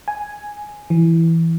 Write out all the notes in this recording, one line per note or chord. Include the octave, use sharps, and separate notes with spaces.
G#5
E3